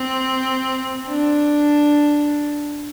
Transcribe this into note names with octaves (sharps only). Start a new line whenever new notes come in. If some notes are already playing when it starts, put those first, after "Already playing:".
Already playing: C4
D4